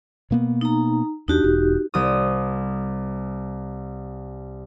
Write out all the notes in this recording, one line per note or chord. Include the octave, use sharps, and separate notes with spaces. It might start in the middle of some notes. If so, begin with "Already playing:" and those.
B2 A#3 B3
D#4 A#5
E2 D4 D#4 F#4 G4
E1
C2 D#6